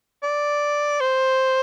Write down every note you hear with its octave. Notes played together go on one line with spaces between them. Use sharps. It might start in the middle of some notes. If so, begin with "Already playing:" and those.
D5
C5